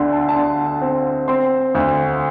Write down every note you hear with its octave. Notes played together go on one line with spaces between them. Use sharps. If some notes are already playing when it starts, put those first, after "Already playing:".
Already playing: D2 D3 C6
A5
A5
D3 C6
C4
C4 C6
D2